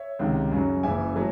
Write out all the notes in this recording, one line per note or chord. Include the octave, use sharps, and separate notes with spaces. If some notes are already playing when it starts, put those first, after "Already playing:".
Already playing: C#5 E5
C#2 C3 D#3
F#2 C#3 F#3
F#1 F#2 C#3 E3 E5 G#5
F#3 A3